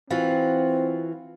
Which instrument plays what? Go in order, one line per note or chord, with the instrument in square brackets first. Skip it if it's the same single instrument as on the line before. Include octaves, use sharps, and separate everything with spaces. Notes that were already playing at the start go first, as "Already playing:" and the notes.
[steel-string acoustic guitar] E3 F4 F#4 [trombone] C4